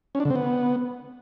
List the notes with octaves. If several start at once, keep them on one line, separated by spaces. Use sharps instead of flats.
C#4
D4
D3
C4
B3